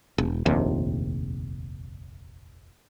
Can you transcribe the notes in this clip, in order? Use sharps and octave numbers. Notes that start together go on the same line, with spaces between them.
E1
F1 A#1 D#2 C3